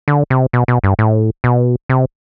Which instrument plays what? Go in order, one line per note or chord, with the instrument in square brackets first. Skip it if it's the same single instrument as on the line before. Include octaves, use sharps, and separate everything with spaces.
[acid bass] D3
C3
B2
B2
G2
A2
B2
C3